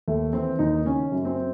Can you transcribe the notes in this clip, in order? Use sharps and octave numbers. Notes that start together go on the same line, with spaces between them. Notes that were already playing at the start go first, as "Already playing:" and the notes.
D#2 A3
E3 C4
D#2 D#4
C#3 C#4
F#2
C4